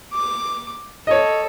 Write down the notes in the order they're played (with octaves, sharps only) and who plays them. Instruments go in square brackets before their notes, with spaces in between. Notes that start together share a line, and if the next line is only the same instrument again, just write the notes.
[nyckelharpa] D6
[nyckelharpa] A4 [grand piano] C#5 D#5